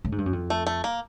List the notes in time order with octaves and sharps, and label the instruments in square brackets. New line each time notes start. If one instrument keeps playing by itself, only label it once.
[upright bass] A2
G#2
G2
F#2
F2
[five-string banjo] A3
A3
A#3